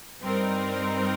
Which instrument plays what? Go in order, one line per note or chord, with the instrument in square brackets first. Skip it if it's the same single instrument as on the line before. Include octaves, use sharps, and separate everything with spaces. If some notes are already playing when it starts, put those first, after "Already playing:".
[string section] G2 G3 C4 D#4 A#4